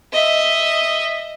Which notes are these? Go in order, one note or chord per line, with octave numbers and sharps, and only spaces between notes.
D#5 E5